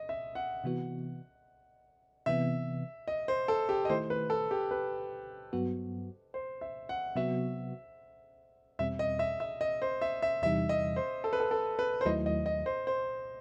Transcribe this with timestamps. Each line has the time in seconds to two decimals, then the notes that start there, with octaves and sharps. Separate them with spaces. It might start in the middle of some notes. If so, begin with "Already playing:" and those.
Already playing: D#5
0.09 E5
0.35 F#5
0.64 C3 E3 B3 F#4
2.26 C3 E3 B3 E5
3.08 D#5
3.28 C5
3.48 A4
3.69 G4
3.85 D#5
3.90 D#3 A3 E4 C5
4.10 B4
4.30 A4
4.51 G4
4.71 B4
5.53 G2 F#3 B3 F#4
6.34 C5
6.61 E5
6.89 F#5
7.16 C3 F#3 B3 F#4 E5
8.79 E2 B2 G3 C4 E5
8.99 D#5
9.19 E5
9.40 E5
9.61 D#5
9.82 C5
10.02 E5
10.22 E5
10.42 E2 C3 E3 G3 D#4 E5
10.69 D#5
10.96 C5
11.24 A4
11.33 B4
11.40 A4
11.51 A4
11.79 B4
12.01 C5
12.05 D#2 D#3 F#3 A3 E4 D#5
12.26 D#5
12.46 D#5
12.66 C5
12.87 C5